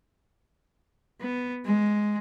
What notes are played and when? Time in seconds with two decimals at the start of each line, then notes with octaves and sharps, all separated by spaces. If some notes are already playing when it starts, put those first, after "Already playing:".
1.21 B3
1.65 G#3